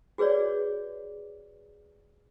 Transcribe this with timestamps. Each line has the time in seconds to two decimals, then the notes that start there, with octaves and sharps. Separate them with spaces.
0.18 F#4 G#4 B4 C#5 D5